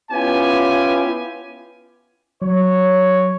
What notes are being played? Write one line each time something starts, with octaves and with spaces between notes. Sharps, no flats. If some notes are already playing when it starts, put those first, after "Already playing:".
B3 C#4 E4 F4 G4 G#5
F#3 C#5